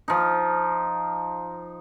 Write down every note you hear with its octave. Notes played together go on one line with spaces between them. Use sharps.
F3 D#4